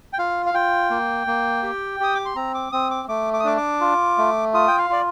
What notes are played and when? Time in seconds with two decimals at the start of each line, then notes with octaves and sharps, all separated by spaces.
0.13 G5
0.19 F4 F5
0.46 F5
0.54 F4 G5
0.90 A#3
1.27 A#3
1.63 G4
2.00 G4 D#6
2.15 D6
2.25 C6
2.35 C4 A#5
2.55 D6
2.72 C4 D#6
2.91 D6
3.08 A3 D6
3.33 D6
3.40 D#6
3.44 D4 D6
3.57 D6
3.81 F4
4.18 A3
4.54 F4 D#6
4.67 G5
4.78 F5
4.90 F4 D5